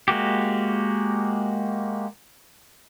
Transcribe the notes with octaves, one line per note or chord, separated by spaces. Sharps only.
G#3 A#3 F#4 G4